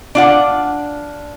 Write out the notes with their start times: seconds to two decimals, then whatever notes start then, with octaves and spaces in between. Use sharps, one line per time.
0.15 D4 F4 F#5